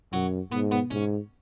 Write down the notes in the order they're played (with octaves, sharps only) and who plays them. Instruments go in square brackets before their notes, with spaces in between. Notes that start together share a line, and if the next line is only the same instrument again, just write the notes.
[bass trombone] F#2 [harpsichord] F#3
[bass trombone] G#2 [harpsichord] B3
[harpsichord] B3
[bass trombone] G#2 [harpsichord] C#4